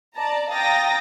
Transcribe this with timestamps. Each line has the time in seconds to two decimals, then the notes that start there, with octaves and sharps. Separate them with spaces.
0.14 D5 A5 A#5
0.51 F5 G5 A#5 D#6 A6 A#6